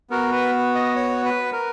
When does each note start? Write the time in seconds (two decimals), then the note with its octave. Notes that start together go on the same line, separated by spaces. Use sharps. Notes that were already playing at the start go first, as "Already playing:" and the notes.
0.10 B3 F#4 A#4
0.32 B4
0.75 D#5
0.96 C#5
1.25 B4
1.53 A#4